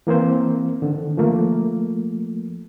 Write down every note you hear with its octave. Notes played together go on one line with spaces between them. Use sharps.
E3 A#3 C4 C5
D3 D#3
F3 A3 A#3